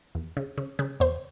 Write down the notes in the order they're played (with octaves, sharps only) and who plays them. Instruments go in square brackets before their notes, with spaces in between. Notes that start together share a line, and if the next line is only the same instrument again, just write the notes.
[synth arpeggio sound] E2
C#3
C#3
C#3
E2 C5